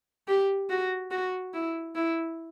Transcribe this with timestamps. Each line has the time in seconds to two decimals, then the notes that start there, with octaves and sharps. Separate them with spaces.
0.28 G4
0.70 F#4
1.11 F#4
1.54 E4
1.95 E4